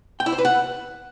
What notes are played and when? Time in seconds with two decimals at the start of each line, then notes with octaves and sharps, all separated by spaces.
0.20 G5
0.26 E4
0.32 C5
0.38 B4
0.45 F#5